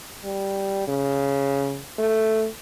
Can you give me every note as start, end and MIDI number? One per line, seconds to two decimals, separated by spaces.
0.24 0.86 55
0.88 1.80 49
1.98 2.46 57